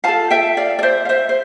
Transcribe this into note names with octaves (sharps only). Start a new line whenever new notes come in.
F4 A4 F5 A5
E5 G5
D5 F5
D5
C5 E5
F5
C5 E5
C5